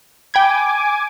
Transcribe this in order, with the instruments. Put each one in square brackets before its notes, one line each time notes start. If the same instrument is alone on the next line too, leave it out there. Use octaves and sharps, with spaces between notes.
[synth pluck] G5 B5 G#6 [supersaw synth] G#5 D6